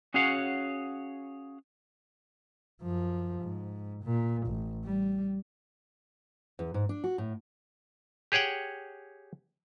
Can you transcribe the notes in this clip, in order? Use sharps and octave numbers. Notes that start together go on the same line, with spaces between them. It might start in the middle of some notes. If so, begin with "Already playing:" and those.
C#4 F#4 G#4 C#5 F5 F#5
F#2 F3
G#2
A#2
A1
G3
E2
G#2
D4
F#4
A2
G4 G#4 C#5 F#5 G5